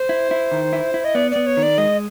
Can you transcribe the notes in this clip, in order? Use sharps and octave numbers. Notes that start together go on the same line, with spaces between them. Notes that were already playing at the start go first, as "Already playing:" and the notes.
Already playing: C5
E4
E4
D#3
E4
E4
D#5
B3 D5
B3 D5
C#5
D#3
D5
G#3 D#5